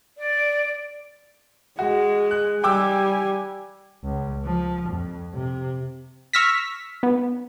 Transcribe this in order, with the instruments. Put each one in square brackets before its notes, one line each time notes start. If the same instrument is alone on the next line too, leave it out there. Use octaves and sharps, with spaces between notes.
[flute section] D5
[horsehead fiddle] G#3 [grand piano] F#4
[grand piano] F#6
[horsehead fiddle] G3 G#5 [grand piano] G5 D6 E6
[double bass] C#2
F3
F2
C3
[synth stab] C#6 E6 F6 A#6 B6
B3